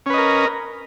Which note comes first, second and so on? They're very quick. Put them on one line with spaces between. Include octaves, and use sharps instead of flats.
C#4 B4 D#5 A#4